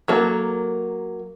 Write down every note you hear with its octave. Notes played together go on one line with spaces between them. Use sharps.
F#3 A#3 A4